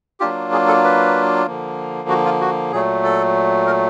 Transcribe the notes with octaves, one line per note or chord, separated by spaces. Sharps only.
F#3 A#3 D4 F4 G4
G#4
A4
B4
D3 F3 A#3
F#4
F4
F#4
A#2 F#3 A3 G#4
A4
A#4